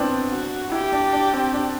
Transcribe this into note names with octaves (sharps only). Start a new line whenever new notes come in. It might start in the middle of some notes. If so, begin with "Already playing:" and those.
Already playing: B3 C4 D4 E4
F#4
E4 G4
D4
D4
C4
D4